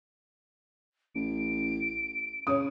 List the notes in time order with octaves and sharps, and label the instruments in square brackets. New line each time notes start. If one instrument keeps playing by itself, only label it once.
[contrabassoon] A1 [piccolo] D7
[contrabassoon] C#3 [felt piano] C#5 D#6